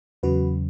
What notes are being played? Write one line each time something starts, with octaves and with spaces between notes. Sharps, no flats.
E2 C#3 F#3 F#4 B4